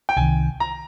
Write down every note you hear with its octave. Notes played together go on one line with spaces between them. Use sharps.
G5
C2 C3 D#3 G#5
A#5